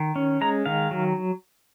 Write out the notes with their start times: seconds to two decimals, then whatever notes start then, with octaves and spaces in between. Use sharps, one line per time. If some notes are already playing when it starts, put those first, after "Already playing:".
Already playing: D#3
0.16 C#4
0.41 G#3 A#5
0.66 D#3 F5
0.91 F#3